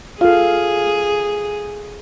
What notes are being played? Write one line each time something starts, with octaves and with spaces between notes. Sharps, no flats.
F4 G#4 A4 F5